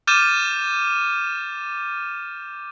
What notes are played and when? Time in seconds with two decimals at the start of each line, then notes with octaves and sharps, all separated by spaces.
0.07 D6 F6 G6 A6 D#7 E7